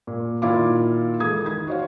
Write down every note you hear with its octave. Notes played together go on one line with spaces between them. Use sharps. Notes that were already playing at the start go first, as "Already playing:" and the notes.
A#2
A#2 D#3 E4 F4 F5 D6
E3 G#3 A4 D#6 G#6
D#3 G#6
F#4 C5 C#5 F5